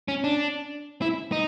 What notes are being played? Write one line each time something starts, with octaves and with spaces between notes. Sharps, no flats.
C#4
D4
E4
D#4